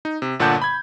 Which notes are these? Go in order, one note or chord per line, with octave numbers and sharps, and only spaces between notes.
D#4
C3
G1 A#2 D3 F#5 A5 G6
B5 G#6